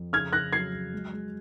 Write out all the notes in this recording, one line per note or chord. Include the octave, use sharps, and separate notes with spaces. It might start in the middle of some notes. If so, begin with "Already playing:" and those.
Already playing: F2
C#3 F6 G#6
C#3 F#6 A#6
F#3 G#6 C7
F#3
G#3
G#3